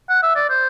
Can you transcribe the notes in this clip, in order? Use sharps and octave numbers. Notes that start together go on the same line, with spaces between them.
F#5
E5
D5
C5